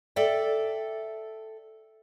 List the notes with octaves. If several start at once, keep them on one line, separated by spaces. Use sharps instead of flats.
A4 D5 E5 G5